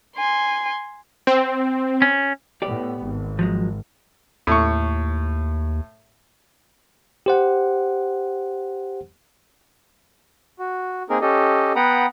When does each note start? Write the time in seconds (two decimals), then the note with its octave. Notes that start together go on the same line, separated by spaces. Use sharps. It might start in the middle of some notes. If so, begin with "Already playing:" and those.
0.16 G#5 C6
1.27 C4
2.02 C#4
2.62 A2 B3 G4 D5
3.02 G#1
3.39 F3 F#3 G#3
4.47 D#2 A2 C#6
7.26 G4 C5 F#5
10.57 F#4
11.10 A#3 C4 D#4 G#4 A#4
11.21 C#4 G4 A4 D#5
11.76 B3 F#5 G5 A#5 B5 D#6